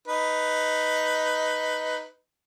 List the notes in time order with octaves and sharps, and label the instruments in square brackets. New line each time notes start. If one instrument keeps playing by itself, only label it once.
[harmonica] D#4 B4